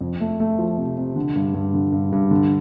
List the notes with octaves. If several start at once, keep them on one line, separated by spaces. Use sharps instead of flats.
F2
A3
A3
F3
C3
C3
D3
G2
G2
D3
G2
G2
D3